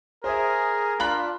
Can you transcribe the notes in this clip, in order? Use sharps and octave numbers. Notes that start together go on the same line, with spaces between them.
G#4 A#4 C5 E5
D4 F4 B5 F#6